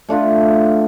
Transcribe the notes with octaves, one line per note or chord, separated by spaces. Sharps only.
A3 D4 F4